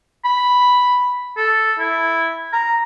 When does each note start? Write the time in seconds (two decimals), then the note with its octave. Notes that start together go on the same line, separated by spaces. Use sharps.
0.24 B5
1.37 A4
1.79 E4
2.53 A#5